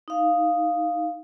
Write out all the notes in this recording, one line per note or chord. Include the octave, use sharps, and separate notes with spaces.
D#4 F5